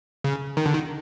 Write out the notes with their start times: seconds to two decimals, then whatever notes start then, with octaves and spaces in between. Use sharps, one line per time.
0.24 C#3
0.57 D#3
0.66 D3
0.74 D#3